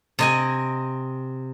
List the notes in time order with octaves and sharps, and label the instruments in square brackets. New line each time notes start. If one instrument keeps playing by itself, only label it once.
[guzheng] C3 D#5 G#5